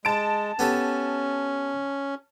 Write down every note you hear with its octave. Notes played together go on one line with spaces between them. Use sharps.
G#3 A5 D7
B3 C#4 G4 A4